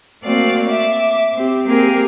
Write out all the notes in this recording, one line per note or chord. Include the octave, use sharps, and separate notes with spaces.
A3 A#3 C4 F#4 D5 F5
E5 D6
C4 G4
A#3 C4 G4 G#4 A#4 G#5